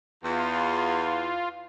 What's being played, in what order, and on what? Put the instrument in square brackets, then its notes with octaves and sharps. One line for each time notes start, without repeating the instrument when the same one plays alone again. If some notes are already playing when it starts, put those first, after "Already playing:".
[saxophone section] E2 [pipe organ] F4